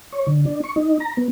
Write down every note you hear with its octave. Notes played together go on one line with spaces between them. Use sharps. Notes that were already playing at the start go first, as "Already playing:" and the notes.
C#5
D3
D4
C#6
D#4
A#5
B3